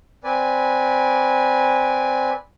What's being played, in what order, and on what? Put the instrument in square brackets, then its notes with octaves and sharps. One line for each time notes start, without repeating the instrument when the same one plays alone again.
[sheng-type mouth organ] C4 B4 D5 G#5